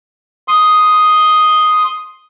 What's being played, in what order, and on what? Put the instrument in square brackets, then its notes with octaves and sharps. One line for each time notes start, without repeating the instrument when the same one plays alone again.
[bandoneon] C6 D#6